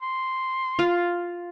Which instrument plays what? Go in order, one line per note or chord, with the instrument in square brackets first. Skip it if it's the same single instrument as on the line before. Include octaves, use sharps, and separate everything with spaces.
[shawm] C6
[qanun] F4